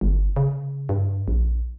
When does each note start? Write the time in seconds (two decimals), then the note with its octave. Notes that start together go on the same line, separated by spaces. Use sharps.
0.01 G1
0.36 C#3
0.89 G2
1.28 A#1